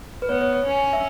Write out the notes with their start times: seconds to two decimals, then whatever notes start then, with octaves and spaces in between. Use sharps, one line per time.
0.22 B4
0.28 B3 C#5
0.41 C#5
0.53 C#5
0.65 C#4
0.93 E5